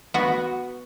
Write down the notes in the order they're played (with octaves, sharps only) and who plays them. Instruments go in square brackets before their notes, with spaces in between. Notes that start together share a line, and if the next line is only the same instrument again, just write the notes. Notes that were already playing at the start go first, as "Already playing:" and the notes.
[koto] B3 F#4